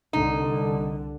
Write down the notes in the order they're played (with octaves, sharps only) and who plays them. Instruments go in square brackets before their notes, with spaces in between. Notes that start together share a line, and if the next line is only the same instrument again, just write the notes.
[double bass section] C2 D3 [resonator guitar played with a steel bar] D#4